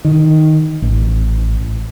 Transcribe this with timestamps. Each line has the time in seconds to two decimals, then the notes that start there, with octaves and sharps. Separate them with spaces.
0.05 D#3
0.82 A1